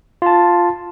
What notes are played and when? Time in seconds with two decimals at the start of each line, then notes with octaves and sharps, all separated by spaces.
0.22 F4 A5